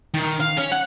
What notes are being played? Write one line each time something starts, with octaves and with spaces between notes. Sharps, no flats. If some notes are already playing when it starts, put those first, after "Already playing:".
D#3
F5
C#4
F#5